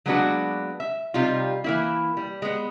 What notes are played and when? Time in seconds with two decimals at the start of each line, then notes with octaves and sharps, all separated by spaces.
0.06 F#3 G#3 A#3 B3 D4 F#4
0.80 E5
1.14 C3 G3 D#4 F4
1.64 E3 A#3 E4
2.17 G3
2.42 G#3 B3